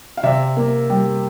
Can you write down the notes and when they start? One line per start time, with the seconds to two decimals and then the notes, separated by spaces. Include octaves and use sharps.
0.17 F5
0.23 C3 D5 E5
0.56 A#3
0.90 G3